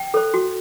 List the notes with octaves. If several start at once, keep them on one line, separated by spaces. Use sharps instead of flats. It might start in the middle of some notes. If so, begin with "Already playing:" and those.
Already playing: G5
A4 C5
F#4